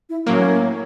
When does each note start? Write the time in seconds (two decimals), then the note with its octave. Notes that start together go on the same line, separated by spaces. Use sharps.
0.09 E4
0.26 A2 F#3 A#3 C#4